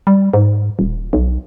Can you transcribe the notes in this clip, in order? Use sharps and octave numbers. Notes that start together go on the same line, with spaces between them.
G3
G#2
D#1
B1